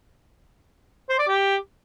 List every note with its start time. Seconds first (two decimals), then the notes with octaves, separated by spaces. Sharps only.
1.09 C5
1.19 D5
1.28 G4